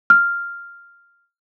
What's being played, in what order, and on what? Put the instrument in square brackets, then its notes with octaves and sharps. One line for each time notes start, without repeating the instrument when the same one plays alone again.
[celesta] F6